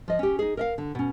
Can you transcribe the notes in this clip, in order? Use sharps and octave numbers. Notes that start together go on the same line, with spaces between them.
F3 D#5
C#4 G4
D#4 G#4
A#4 D#5 F5
D3
B2 C#4